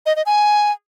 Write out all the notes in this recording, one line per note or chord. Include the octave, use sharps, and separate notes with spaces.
D#5
D#5
G#5